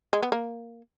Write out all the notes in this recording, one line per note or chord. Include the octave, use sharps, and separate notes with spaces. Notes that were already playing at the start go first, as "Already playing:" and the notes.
G#3
B3
A#3